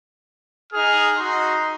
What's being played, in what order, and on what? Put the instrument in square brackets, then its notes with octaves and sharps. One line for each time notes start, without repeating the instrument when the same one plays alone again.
[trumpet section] D#4 G#4 [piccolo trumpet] F6
[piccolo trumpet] D#4 [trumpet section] F#4 C6